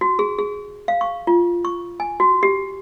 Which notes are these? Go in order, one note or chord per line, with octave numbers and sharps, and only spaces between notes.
F#4
G#4
G#4
F5
C#6
F4
C#6
G#5
F#4
G4